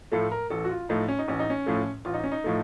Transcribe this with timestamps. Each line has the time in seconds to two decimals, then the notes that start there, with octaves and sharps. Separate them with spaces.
0.12 A2 F3 A3 A4
0.32 A#4
0.50 A1 A4
0.64 F#4
0.69 F4
0.89 A2 F3 A3 D#4
1.08 C#4
1.19 D#4
1.28 A1 C#4
1.39 D#4
1.50 C#4
1.66 A2 F3 A3
2.05 A1 F4
2.14 D#4
2.24 C#4
2.32 D#4
2.44 A2 F3 A3